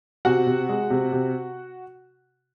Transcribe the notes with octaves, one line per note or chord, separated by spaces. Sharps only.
C3 F#4 F#5
C3
G#3
C3
C3